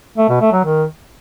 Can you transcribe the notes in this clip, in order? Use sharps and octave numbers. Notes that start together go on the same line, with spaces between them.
A3
B2
A3
F#3
D#3